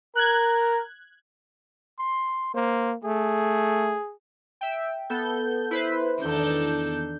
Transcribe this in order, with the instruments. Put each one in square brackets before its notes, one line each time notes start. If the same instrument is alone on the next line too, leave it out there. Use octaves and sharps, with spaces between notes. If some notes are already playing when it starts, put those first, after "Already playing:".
[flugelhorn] A#4 [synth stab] F#6 G#6
[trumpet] C6
[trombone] A#3 [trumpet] C5
[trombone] A3 [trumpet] G#4
[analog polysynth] E5 G5
B3 A4 G6
E4 B4 C5
[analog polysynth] E2 G6 [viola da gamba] D#3 D4 A4